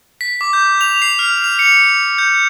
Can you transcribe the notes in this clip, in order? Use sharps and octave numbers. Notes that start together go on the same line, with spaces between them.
B6
D6
G6
F7
C7
F6
F7
C#7
G6